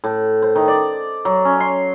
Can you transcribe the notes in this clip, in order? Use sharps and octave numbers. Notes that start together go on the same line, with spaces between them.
A2
C5
D#3
D5
F#3
C#4
C6